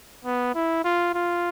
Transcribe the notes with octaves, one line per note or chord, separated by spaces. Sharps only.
B3
E4
F4
F4